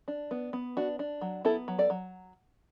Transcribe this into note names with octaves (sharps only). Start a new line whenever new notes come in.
D4
B3
B3
D4 F#4
D4
F#3
B3 E4 A4
F#3
A4 D5
F#3